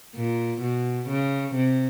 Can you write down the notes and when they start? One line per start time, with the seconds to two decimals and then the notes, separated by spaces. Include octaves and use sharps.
0.16 A#2
0.62 B2
1.09 C#3
1.55 C3